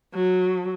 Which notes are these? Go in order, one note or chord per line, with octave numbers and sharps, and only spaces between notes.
F#3